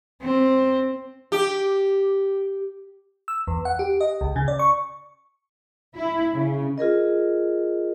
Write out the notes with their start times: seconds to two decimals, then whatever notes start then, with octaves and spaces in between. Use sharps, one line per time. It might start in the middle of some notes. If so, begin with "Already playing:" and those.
0.22 C4
1.32 G4
3.28 E6
3.47 E2
3.65 F#5
3.79 G4
4.01 D#5
4.21 C#2
4.36 C#3
4.48 D5
4.59 C#6
5.96 E4
6.32 C#3
6.78 F4 G#4 A#4 D#5